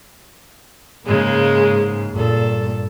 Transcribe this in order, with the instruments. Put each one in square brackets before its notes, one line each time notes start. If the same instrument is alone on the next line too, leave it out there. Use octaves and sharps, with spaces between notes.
[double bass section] G#2 [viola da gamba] C#3 G#3 A#3
[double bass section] G2 [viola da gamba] A#2 A4